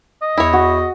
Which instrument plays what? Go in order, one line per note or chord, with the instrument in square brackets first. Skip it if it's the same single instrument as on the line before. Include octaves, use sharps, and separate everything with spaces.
[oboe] D#5
[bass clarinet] E2 [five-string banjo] E4 C#5
[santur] F#4